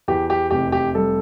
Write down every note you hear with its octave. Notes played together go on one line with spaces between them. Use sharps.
E2 G4
G4
F1 G4
G4
G3 A4